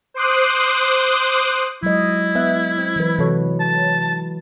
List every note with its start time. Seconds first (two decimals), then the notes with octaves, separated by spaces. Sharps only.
0.14 C5 C6 D6 D#6 F#6
1.83 F#3 G#3 E4 D#5
2.35 B3 E5 F#6
2.78 C4
2.96 E3 F#3 B4
3.18 C3 E3 F#4 A4 C#5
3.60 A5